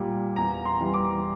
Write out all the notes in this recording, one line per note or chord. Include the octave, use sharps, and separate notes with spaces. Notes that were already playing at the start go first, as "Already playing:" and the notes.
Already playing: A#2 G3
E2 A#5
C6
E3 G3
D6